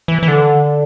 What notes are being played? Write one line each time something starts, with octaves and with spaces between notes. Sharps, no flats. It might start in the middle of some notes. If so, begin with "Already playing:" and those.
E3
E3
D3